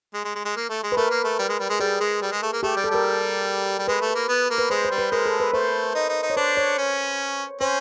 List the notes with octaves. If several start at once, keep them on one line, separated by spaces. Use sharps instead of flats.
G#3
G#3
G#3
G#3
A#3
A3
G#3
B4
A3 A#4
A#3
A3
G3
G#3
G3
G#3
G3 G#4
G#3
G3
G#3
A3
A#3
A3 G4
G3
A4
G3 A#4
G3
G#3 B4
A3
A#3
B3
A#3
B4
G#3 C5
C5
G3
B4
G#3 A#4
A4
B4
A3 C5
D#4
D#4
D#4
C#5
D4 C5
C#5
C#4
C#4 C5